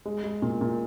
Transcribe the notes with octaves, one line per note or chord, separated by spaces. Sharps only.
G#3
G#3
A#2
A#2